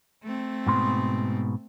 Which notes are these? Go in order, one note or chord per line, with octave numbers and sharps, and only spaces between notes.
A3 C4
G#2 B2 C6